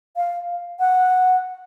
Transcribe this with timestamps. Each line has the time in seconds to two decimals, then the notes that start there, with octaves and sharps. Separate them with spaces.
0.16 F5
0.80 F#5